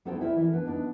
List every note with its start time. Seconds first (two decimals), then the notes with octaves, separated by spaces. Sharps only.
0.05 B3 D#4 A4 C5 C#5 G5
0.21 E4 A#4 D5
0.36 E3 A4 A#4
0.53 B3 D4
0.65 B3 D4 D#4